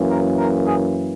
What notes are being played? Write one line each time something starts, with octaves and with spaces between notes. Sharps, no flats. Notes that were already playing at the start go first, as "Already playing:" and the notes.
Already playing: F#2 E3 A#3
A#4
A#4
G#4